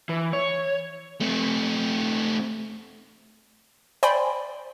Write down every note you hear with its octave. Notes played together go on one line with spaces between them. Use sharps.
E3
C#5
A3 C4
C5 D5 G5 G#5 B5 C6